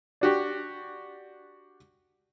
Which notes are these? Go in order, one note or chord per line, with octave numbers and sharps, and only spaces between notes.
D4 F#4 G4